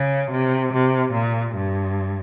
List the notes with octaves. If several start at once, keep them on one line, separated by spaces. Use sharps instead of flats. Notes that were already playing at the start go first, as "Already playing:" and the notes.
Already playing: C#3
C3
C3
A#2
G2